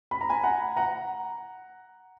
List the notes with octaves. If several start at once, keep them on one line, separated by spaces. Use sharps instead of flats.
B5
A#5
G#5 B5
F#5 A#5
F#5 A#5